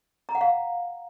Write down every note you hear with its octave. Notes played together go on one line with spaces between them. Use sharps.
A#5
F#5
F5